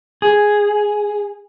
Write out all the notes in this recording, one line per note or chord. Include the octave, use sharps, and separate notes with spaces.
G#4